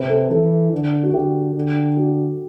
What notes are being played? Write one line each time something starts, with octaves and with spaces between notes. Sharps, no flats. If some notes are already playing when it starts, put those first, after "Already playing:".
Already playing: C3 B4
A4
E3 A4
D3
F#4
D3 G4
D3
F#4